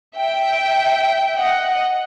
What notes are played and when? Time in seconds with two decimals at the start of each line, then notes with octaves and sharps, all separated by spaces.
0.17 E5 G5
1.37 D#5 F#5